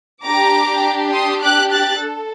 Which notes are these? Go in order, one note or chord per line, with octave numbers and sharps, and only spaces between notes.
D4 G4 A#5 D6
C6 D#6
D6 F#6
F#6 A6
A4